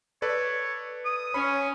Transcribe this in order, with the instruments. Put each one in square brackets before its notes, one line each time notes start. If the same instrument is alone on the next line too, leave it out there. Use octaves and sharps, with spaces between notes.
[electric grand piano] A4 B4 D5 [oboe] C#5
[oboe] D#6
[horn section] C#4 [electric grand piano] B5